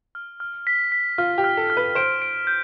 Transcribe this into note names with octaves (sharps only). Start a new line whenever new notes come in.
F6
F6
B6
B6
F4 F6
G4
F6
A4
F6
B4
C5 D7
D7
G6